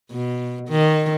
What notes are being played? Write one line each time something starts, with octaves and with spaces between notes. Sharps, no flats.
B2
D#3